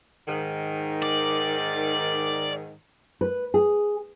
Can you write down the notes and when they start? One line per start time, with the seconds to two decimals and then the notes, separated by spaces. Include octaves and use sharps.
0.28 G#2 D#3
1.03 D5
3.21 B4
3.54 G#4